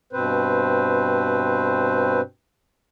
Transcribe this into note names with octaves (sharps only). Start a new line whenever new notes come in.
G2 B2 C4 B4 C5